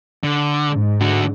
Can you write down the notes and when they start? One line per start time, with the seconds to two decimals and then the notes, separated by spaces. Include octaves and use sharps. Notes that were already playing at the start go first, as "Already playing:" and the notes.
0.24 D3
0.72 G#2
1.01 D3 F#4